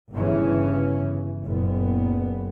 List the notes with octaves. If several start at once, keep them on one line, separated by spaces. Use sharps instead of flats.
G1 G2 C#3 E3 C#4
F#1 A#2 B3